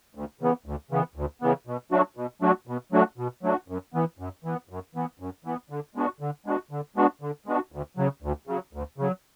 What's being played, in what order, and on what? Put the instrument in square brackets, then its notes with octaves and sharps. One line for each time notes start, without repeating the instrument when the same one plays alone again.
[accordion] D2
C#3 E3 B3
D2
C#3 E3 B3
D2
C#3 E3 B3
B2
F#3 A3 D4 F#4
B2
F#3 A3 D4 F#4
B2
F#3 A3 D4 F#4
B2
F#3 A3 D4 F#4
F#2
E3 B3
F#2
E3 B3
F#2
E3 B3
F#2
E3 B3
D3
G#3 B3 D4 F#4
D3
G#3 B3 D4 F#4
D3
G#3 B3 D4 F#4
D3
G#3 B3 D4 F#4
D2
C#3 F#3
D2
C#3 F#3
D2
C#3 F#3